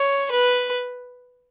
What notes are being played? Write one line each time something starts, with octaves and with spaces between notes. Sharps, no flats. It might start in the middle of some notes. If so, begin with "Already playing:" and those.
Already playing: C#5
B4